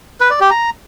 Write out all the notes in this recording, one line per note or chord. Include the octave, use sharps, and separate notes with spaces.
B4
D5
G4
A#5